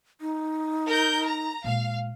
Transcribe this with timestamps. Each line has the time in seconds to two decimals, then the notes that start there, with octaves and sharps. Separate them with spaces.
0.21 D#4
0.87 A#4 G6
1.25 A#5
1.64 A#2 G#3 F5